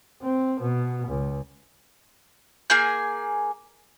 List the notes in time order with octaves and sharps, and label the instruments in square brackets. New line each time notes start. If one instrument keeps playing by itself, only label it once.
[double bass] C4
B2
C#2
[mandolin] A#3 G#4 G#5 G6